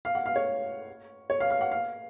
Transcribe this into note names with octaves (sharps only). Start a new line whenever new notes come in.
F5
F#5
F5
C#5
C#5
F5
F5
F#5
F5